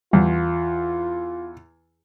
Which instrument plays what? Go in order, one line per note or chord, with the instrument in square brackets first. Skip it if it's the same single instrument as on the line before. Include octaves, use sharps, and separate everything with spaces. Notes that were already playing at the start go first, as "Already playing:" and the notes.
[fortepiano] E2 [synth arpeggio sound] G3 [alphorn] F4